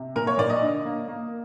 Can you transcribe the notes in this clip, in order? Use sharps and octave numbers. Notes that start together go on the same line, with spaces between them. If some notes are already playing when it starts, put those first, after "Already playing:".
Already playing: C3
A#2 A#4
C#5
A#2 D5
D#5
D3
A#3
A#3